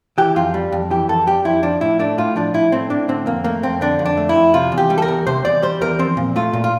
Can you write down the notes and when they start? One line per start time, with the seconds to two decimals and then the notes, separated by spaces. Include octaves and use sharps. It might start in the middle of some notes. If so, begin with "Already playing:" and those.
0.18 E3 G4
0.36 F2 F4
0.54 G3
0.72 F2
0.90 E3 G4
1.09 F2 A4
1.27 G3 G4
1.45 F2 E4
1.63 F3 D4
1.81 A2 E4
1.99 A3 D4
2.18 A2 F4
2.36 F3 D4
2.54 A2 E4
2.72 A3 C4
2.90 A2 D4
3.08 D3 C4
3.26 F2 A#3
3.44 A3 A#3
3.63 F2 C4
3.81 D3 D4
3.99 F2
4.05 D4
4.17 A3
4.29 E4
4.35 F2
4.54 C3 F4
4.72 E2
4.78 G4
4.90 G3
4.98 A4
5.02 A#4
5.08 E2
5.27 C3 C5
5.45 E2 D5
5.62 G3 C5
5.81 E2 A#4
5.99 F3 C4
6.17 A#2
6.36 A3 F4
6.53 A#2
6.64 F4